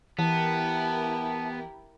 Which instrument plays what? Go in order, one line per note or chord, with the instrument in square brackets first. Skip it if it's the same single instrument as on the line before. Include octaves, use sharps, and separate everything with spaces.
[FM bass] E3 [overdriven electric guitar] B3 [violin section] E4 G4 A#4 [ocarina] A5